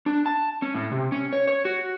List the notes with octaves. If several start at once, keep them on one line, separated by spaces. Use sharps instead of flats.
D4
A5
C#4
A2
C3
C#4
C#5
C#5
F#4